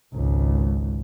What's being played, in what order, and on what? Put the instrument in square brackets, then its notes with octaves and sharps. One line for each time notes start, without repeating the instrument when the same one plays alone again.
[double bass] G#1 C#2